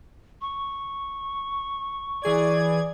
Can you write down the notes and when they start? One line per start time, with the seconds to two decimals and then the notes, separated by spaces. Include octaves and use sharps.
0.41 C#6
2.23 E3 G#4 D5 G#6